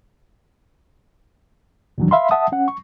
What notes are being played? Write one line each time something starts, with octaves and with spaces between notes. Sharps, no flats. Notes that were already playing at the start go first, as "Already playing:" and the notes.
D#2 A#2 D#3 E3 F#3 D4
E5 F5 B5 C6
E5 F#5 A5 D#6
C#4 F#5
C#6